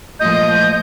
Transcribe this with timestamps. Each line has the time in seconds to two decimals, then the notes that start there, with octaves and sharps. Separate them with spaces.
0.20 A#2 F3 A3 D#5 G6